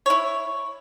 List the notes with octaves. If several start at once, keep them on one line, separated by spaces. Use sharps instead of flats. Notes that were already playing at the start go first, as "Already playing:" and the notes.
E4 C#5